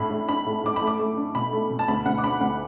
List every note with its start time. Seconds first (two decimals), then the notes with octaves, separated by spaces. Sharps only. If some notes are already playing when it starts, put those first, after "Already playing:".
Already playing: A2 D4 B5
0.11 A2
0.29 D4 B5
0.46 A2
0.64 A2 D6
0.76 B5
0.82 A3
0.87 D6
0.99 A3
1.17 D4
1.35 B2 B5
1.53 A3
1.70 B2
1.79 A5
1.88 D2 B5
2.06 D2 F#5
2.18 D6
2.23 D4 B5
2.41 D2 F#5